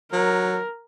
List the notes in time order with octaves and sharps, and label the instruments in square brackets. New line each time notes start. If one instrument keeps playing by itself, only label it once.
[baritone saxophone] F#3 [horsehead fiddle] A#4